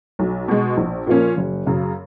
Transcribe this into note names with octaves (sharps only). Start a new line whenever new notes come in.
B1
B2 G#3
A#1
A#2 F3 A#3 C#4
F#1
F#2 C#3